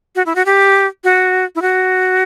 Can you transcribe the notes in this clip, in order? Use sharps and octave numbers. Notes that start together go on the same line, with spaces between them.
F#4
E4
F#4
G4
F#4
E4
F#4